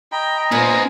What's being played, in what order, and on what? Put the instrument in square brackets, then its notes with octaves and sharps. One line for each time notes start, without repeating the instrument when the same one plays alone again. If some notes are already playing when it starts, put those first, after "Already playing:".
[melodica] D#5 A#5 B5 [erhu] G5
[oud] A#2 [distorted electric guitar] B3 C4 [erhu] G#5